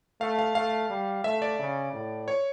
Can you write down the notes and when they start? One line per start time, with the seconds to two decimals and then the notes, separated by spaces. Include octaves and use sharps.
0.21 A3 F5
0.39 F5
0.55 A3 F5
0.90 G3
1.24 A3 E5
1.42 D5
1.59 C#3
1.93 A2
2.28 C#5